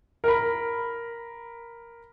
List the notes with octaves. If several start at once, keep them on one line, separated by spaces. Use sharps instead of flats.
A#4 B5